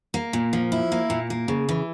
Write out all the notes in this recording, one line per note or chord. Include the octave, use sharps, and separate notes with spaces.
A#3
A#2
F3
E4
A#3
A#2
A#3
C#3
E3